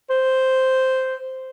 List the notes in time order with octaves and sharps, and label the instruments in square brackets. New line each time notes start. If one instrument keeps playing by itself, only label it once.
[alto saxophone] C5